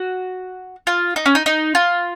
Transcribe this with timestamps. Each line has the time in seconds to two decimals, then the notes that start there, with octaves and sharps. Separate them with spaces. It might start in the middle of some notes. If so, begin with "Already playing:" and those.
Already playing: F#4
0.87 F4
1.16 D#4
1.26 C#4
1.35 D#4
1.46 D#4
1.75 F4